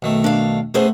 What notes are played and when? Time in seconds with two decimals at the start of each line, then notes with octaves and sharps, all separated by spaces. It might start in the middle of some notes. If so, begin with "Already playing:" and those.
0.02 B1 D#3 A3
0.24 D4 F5
0.74 A3 B3 C#4 G#4 C5